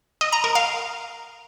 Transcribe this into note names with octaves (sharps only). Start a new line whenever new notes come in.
D#5
A#5
A#4
F5